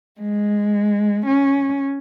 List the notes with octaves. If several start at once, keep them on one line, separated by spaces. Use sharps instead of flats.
G#3
C#4